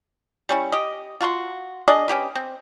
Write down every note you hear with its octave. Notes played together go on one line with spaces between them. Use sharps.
G3 C#4 E4
G4 D#5
F4 F#4 A#5 C6
D4 G#4 D5 D#5
C#4 E4 G4 B4
C4